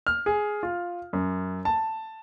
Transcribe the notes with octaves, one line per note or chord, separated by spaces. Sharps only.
F6
G#4
F4
F#2
A5